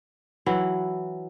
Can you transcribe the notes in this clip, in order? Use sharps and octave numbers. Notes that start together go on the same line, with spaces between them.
E3 F#3 E4